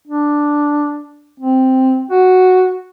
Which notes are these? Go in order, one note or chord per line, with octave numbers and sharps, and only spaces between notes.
D4
C4
F#4